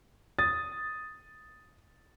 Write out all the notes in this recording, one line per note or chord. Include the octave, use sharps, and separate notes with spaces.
D#6 A6